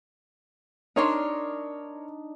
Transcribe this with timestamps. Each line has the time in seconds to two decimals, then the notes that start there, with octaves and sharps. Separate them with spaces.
0.96 D4 D#4 A#4 C#5 C6